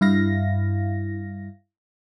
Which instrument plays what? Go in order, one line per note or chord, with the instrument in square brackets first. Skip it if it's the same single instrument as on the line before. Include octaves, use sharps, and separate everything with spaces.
[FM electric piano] G2 E4 F5 A#6